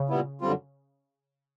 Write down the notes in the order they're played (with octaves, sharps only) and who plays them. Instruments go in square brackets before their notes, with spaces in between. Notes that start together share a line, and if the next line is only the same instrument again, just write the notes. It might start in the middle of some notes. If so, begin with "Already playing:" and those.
Already playing: [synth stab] C#3
[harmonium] A#2 G3 B3 E4
F#2 D3 G3 C4 F4